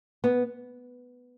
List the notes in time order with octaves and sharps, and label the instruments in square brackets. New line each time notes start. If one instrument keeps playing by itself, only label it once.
[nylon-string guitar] B3